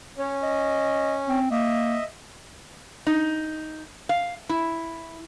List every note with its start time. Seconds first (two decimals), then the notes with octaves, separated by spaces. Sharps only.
0.18 C#4 C#5
0.43 D#5
1.29 C4
1.51 A#3 D#5 E5
3.07 D#4
4.09 F5
4.49 E4